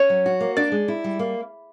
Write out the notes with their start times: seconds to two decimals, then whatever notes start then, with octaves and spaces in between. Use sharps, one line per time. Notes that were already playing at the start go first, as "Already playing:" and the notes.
Already playing: C#4 C#5
0.10 F#3
0.26 F#4
0.41 A#3
0.57 D4 D5
0.72 G#3
0.88 E4
1.04 G3
1.19 A#3